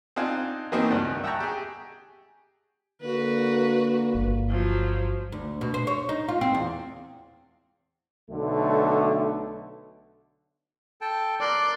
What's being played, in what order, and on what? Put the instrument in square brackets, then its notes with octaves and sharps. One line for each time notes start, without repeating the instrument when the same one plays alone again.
[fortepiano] C4 D4 D#4 F4 F#5 G#5
E3 F#3 A3 A#3 C4 D#4
C#2 G2 D4 F#5
G#1
E5 F#5 G5 A5 A#5 C#6
G4 G#4
[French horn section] D3 A#3 [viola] F#4 B4
[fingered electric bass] G1
[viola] F3 F#3
[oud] D2
B2
C5
C#5
D#4
F4
C4
E2
[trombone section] B1 D3 A3
[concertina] A4 G5 A5
[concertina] A#4 C6 F#6 [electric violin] D5